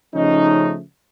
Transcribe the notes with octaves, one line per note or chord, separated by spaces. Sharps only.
C#3 F3 A3 C#4 D#4